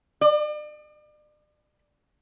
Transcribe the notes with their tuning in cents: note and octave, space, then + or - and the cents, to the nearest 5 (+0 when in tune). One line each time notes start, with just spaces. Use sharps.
D5 +40